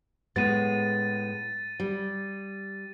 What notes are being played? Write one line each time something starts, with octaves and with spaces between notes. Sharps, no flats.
A2 G#3 B3 A6 D#7
G3